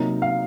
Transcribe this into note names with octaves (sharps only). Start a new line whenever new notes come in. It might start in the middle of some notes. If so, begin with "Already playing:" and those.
Already playing: C3 F#3 A#3 D#4
F5